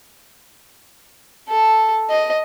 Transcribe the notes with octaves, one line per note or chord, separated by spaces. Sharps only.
A4
D#5